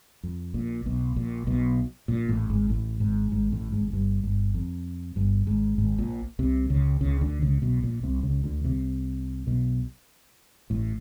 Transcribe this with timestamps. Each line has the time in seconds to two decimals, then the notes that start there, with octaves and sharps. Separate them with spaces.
0.23 F2
0.54 A#1 A#2
0.85 B1 B2
1.16 A#1 A#2
1.47 B1 B2
2.08 A#1 A#2
2.28 A1 A2
2.50 G#1 G#2
2.69 A1 A2
3.00 G#1 G#2
3.32 G#1 G#2
3.52 A1 A2
3.72 G#1 G#2
3.88 G#2
3.93 G1 G2
4.24 G1 G2
4.54 F2
5.16 G1 G2
5.47 G#1 G#2
5.78 G#1 G#2
5.98 A#1 A#2
6.39 C2 C3
6.70 C#2 C#3
7.01 C#2 C#3
7.21 D2 D3
7.42 C#2 C#3
7.62 B1 B2
7.83 A#1 A#2
8.03 C2 C3
8.23 C#2 C#3
8.44 D2 D3
8.64 C2 C3
9.47 B1 B2
10.70 A1 A2